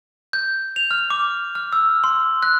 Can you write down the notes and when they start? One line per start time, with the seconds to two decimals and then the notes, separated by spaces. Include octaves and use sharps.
0.33 G6
0.76 F7
0.91 F6
1.10 D6
1.55 F6
1.73 E6
2.04 C6
2.43 F#6